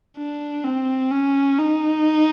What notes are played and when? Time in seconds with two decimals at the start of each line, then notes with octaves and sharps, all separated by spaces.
0.18 D4
0.64 C4
1.11 C#4
1.58 D#4